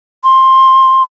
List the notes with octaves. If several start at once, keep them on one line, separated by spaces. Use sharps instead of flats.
C6